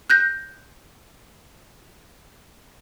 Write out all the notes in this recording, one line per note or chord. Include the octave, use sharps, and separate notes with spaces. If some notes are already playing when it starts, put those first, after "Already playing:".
F#6 G6 A#6